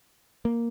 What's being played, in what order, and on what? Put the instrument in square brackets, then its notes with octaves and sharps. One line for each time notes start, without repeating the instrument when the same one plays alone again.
[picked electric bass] A#3